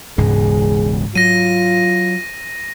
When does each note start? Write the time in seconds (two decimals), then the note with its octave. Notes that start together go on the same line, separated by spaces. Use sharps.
0.18 E1 C#2 G#2 G#3 G#4
1.15 F#3 F4 A#6 D#7